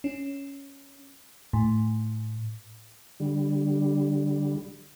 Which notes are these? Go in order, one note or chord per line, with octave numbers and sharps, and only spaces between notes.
C#4
A2
D3 G3